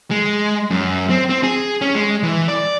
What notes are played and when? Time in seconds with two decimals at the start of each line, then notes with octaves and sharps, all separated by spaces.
0.11 G#3
0.70 F#2
1.10 C4
1.30 C4
1.43 G#4
1.81 C#4
1.95 G#3
2.23 E3
2.48 D5